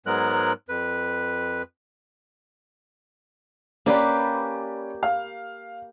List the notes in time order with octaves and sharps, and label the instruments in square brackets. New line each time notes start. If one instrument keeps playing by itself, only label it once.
[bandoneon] G#2 F#3 G#3 B3 A#4 F#6
F2 B4
[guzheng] A#3 G4 B4 [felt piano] C#4 D5
[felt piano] F5